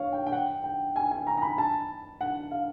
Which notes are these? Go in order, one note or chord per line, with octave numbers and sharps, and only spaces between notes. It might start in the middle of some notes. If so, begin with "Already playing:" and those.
Already playing: C#5 F5
G5
G5
F#5
G5
G#5
G#5
A#5
A#5
B5
A5
F#5
F5